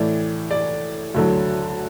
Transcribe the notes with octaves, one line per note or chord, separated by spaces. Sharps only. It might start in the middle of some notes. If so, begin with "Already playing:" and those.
Already playing: A2 E3 D5
D5
D2 D3 F#3